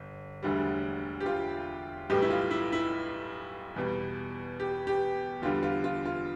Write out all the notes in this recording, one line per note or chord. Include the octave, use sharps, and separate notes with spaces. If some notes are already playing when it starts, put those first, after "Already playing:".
Already playing: G1
E1 D2 D3 G3
G4
F4
B1 A2 E3 G3 G4
E4
F4
E4
E4
E2 B2 G3
G4
G4
E2 D3 G3 F4
F4
F4
F4